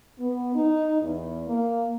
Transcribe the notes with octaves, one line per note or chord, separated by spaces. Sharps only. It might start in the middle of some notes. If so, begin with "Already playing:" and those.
B3
D#4
E2
A#3